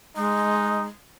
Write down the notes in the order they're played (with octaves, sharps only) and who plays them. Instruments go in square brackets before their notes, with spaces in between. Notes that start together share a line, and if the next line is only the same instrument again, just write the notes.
[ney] G#3 [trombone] D#4